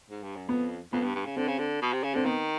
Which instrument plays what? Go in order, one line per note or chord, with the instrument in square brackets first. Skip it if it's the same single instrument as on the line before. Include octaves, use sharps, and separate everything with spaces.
[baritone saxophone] G#2
G2
F#2
[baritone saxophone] F2 [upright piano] B3
[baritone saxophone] F2 [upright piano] B3
[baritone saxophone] G2
G2
C#3
[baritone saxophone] D3 [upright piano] C4
[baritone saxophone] C#3
D3
B2
C3
C#3
[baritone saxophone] D3 [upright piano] C4
[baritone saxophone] D#3 [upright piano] B3